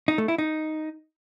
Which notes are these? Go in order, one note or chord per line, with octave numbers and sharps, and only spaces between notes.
D#4
A3
E4
D#4